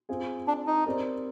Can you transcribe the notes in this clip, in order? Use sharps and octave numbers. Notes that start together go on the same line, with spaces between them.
C4 F4 G#4
D4
D#4
C4 G4 A#4 D5